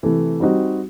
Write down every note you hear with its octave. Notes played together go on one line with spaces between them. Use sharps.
C3 E3 A3
G3 C4 D#4 F#4